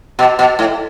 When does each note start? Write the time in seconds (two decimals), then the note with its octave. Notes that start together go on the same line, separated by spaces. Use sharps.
0.19 B2
0.39 B2
0.59 A2